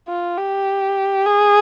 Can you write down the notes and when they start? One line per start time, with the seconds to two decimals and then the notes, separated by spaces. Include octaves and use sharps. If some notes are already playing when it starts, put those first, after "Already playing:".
0.08 F4
0.37 G4
1.26 G#4